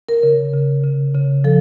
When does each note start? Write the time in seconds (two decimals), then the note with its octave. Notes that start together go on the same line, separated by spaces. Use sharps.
0.09 A#4
0.23 C#3
0.53 C#3
0.84 C#3
1.14 C#3
1.44 F3 A4